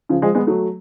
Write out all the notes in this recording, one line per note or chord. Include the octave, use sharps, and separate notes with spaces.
C#3 F3
F3 G#3
G#3 B3
F#3 A3